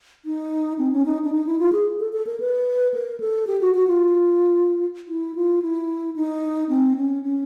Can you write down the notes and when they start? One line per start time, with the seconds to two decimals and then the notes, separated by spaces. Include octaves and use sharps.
0.25 D#4
0.78 C4
0.92 C#4
1.06 D#4
1.25 D4
1.32 D#4
1.46 E4
1.59 F4
1.72 G#4
2.00 A4
2.13 A4
2.27 A#4
2.40 B4
2.94 A#4
3.20 A4
3.47 G4
3.61 F#4
3.74 F#4
3.87 F4
5.08 E4
5.35 F4
5.62 E4
6.16 D#4
6.69 C4
6.96 C#4
7.23 C#4